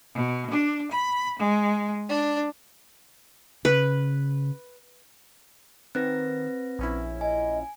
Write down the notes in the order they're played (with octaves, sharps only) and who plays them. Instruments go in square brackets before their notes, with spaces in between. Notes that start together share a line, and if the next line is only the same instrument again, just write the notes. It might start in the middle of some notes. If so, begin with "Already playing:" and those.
[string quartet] B2
D4
B5
G#3
D4
[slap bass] C#3 [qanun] B4
[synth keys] D#3 [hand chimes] C4 B4 A#6
[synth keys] A#1 C#4 E4
[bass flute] D#5 [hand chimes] G#5